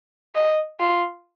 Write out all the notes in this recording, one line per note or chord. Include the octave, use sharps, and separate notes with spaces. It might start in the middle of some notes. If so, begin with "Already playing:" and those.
D#5
F4